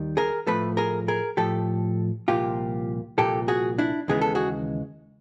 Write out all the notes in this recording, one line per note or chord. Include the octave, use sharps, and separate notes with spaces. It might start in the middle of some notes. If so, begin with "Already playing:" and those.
Already playing: D#2 D#3 G3
G#4 A#4
A2 F3 A3 A4 B4
G#4 A#4
G#4 A#4
A2 F3 A3 G4 A4
C2 A#2 F3 A#3 F4 G4
C2 A#2 F3 A#3 G4 A4
F#4 G#4
D4 E4
D#2 C#3 E3 G#3 B3 G#4
A4
F#4 G#4